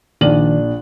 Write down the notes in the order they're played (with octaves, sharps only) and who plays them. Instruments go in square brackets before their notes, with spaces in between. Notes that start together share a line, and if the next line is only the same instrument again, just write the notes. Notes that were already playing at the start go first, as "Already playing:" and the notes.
[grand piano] A#1 D4 F#7 [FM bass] D#3